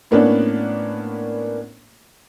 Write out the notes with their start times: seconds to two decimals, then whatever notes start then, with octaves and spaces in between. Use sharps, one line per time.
0.11 A2 A#3 B3 C#4 D4